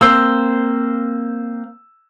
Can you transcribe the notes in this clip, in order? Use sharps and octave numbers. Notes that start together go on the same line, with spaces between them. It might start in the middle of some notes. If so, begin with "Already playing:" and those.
A#3 C4 C5 E6